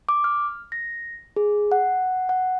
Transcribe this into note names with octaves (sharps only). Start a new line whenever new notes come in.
D6
F6
A#6
G#4
F#5
F#5